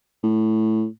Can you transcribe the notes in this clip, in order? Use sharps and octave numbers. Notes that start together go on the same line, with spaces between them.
A2